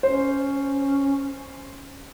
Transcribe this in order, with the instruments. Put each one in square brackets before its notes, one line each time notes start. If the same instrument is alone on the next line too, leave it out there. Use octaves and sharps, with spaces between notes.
[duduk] C#4 [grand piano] C5